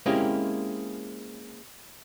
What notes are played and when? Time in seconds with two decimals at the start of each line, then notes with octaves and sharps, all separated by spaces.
0.06 G#3 A#3 C4 C#4 E4 G4